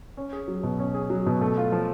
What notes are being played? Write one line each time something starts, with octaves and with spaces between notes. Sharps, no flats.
C#4
G#4
F#3
B2
C#4
G#4
F#3
B2
A3
F4
F3